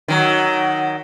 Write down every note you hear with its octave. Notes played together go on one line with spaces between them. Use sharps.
D#3 F#3